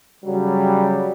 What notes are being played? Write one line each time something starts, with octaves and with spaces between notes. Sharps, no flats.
C#3 F#3 G3